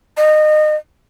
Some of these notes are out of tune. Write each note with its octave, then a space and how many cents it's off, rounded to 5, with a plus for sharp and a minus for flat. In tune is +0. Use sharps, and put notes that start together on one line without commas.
D#5 -25